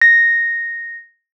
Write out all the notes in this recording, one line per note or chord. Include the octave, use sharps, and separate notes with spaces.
A#6